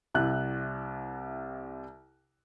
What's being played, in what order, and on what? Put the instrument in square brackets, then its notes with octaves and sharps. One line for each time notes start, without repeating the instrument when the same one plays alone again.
[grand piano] C2 C3 E4 F#6